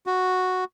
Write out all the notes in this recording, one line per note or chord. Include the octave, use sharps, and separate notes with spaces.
F#4